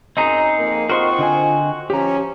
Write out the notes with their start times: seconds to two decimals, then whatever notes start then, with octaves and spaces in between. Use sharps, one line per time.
0.17 F#2 C4 D#4 G#4 D#5 A#5
0.58 F2 A#3
0.89 C4 F4 F#4 A#4 C5 D#5 C6 C#6
1.19 D3 D#5 G#5
1.90 F3 C#4 G4 A#5